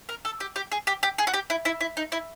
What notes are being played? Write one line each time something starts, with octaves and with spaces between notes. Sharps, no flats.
A#4
A4
G4
G4
G#4
G4
G4
G#4
F#4
G4
E4
E4
E4
D#4
E4